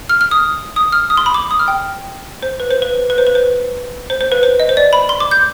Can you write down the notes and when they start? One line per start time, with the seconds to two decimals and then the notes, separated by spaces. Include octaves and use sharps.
0.09 F6
0.21 F6
0.31 D#6
0.76 D#6
0.92 F6
1.10 D#6
1.17 C6
1.26 B5
1.34 D6
1.51 D#6
1.59 F6
1.68 G5
2.43 C5
2.60 B4
2.71 C5
2.82 B4
3.10 B4
3.18 C5
3.27 B4
3.35 C5
4.10 C5
4.21 C5
4.32 B4
4.43 C5
4.60 D#5
4.69 C5
4.77 D5
4.93 B5
5.09 C6
5.20 D6
5.31 G6